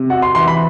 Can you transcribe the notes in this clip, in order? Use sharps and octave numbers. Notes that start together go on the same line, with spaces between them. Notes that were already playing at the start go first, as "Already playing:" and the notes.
Already playing: C3
F#4 F#5
C6
E3 C6
B5